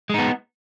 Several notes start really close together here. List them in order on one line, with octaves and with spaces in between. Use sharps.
G#3 D#4 B3